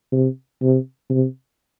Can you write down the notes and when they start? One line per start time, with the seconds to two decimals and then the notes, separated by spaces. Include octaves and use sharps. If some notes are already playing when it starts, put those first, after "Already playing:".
0.12 C3
0.62 C3
1.10 C3